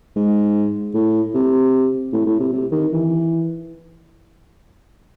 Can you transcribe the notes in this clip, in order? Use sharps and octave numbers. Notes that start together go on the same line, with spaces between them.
G#2
A2
C3
A2
A2
C3
C3
D#3
E3